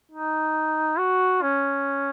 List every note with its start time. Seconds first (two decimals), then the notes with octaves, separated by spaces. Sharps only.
0.11 D#4
0.98 F#4
1.42 C#4